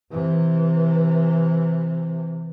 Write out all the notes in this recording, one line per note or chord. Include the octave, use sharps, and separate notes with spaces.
C3 E3